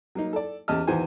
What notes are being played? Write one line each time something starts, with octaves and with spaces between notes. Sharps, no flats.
F#3 A#3 D#4
A4 D5
E2 C#4 G4 D#5 A5 F6
E2 D#3 E3 F#4 C5 G#5